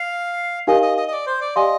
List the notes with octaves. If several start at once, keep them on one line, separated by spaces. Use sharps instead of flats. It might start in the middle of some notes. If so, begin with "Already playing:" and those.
Already playing: F5
D#4 G4 A#4 D#5 F5 G#5
D#5
D#5
D#5
D5
C5
D5
G4 D5 D#5 F5 G#5 C6